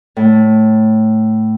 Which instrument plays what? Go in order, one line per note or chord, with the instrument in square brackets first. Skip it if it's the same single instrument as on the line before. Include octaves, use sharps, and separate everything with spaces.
[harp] A2